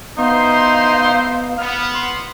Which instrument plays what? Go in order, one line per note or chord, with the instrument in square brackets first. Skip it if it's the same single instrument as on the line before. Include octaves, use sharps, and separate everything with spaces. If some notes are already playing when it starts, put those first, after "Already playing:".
[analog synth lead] B3 [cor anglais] D#4 [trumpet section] E4 C5 C6 [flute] F5
[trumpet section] B3 [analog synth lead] F6
[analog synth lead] C6